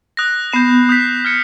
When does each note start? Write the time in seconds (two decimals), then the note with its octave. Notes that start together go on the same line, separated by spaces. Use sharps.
0.17 D#6 F#6 A#6
0.53 B3 G6 C7 E7
0.89 D#6 G6 B6
1.25 F6 G#6 C#7